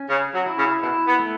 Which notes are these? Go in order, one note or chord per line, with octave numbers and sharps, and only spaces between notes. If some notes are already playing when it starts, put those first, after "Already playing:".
Already playing: C#4
C#3 C#5
F#3
E4
C#3
B2 E4
B3
A3